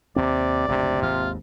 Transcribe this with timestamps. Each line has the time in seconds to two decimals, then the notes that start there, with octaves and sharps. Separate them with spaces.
0.16 D#2 C3 C4 D5
0.68 F#1 D2 G#2 C3
1.02 G#1 D#2 G#2 F4